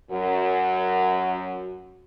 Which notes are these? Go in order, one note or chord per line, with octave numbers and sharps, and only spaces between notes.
F#2 F#4